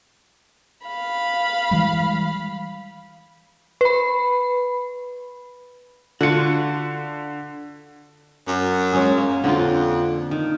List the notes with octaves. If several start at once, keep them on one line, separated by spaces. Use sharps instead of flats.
F5 B5
E3 G3 G#3
B4 B5
D3 F4 F#4 C#7
F#2
G#3 C#4 G#4
A#3
F2 D3 F4
D#3